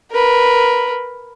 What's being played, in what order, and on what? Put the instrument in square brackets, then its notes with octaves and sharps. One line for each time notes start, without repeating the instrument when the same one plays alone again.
[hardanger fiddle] A#4 B4